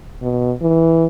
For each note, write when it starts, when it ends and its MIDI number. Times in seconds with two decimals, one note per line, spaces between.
0.22 0.53 47
0.62 1.07 52